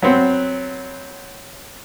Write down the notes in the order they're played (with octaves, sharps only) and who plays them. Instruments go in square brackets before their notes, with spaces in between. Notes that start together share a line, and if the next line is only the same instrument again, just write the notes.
[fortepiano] F#3 B3 C4